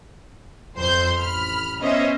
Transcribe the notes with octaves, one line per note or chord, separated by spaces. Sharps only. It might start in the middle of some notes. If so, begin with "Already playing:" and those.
F2 C5 C6 G6
A1 B5 F6
B3 C#4 C5 D#5 E5